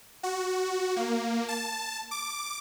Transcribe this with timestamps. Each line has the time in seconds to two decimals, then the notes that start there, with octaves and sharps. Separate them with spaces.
0.23 F#4
0.96 A#3
1.48 A5
2.11 D6